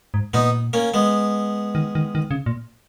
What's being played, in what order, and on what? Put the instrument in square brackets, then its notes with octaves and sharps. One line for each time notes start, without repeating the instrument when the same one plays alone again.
[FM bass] G#2
[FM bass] A#2 [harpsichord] B3 D#4
[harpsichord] A#3 C#4
G#3 B3
[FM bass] D#3
D#3
D#3
C#3
A#2